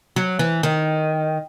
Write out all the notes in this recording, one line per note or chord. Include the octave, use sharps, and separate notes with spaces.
F#3
E3
D#3